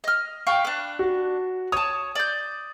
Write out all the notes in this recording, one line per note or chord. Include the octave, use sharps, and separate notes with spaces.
D#5 F6
F5 G5 C#6
D4 B4
F#4
C#5 A5 D#6
D5 G6